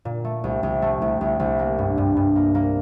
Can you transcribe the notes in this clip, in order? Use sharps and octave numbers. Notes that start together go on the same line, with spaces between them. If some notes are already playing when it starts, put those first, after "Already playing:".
A#2
A3
C2
C2
A3
C2
C2
C2
A#3
G2
G2
G2
A#3
A#3